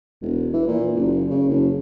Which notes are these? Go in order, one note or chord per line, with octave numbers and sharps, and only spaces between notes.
E1
E3
A#2
F#1
C#3
F#1